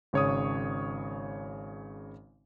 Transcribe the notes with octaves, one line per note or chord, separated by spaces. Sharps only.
G#1 C#3 C#5 C#6 D#6